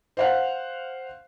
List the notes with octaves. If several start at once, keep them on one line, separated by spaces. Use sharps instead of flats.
C5 F5 F#5